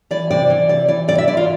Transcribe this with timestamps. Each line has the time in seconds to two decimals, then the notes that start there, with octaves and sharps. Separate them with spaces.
0.11 E3 D5
0.31 C3 D5
0.50 E3
0.69 C3 D5
0.88 E3 D5
1.08 C3 D5
1.18 E5
1.28 E3 D5
1.37 F4